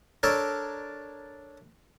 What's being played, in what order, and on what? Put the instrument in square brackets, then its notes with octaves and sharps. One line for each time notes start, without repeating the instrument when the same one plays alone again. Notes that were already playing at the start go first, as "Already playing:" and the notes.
[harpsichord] D4 A4 A#4 C#5 D5